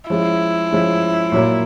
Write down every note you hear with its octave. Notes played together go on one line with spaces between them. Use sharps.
F3 G#3 C#4 E4
F3 G#3 C#4
A#2 F#3 A#3